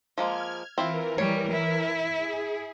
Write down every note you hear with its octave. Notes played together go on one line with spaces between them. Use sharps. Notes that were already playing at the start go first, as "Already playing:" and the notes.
F3 G#3 A#3 F6 G#6
E3 C4 E4 F4 A#4
G3 C#5
E4
G#4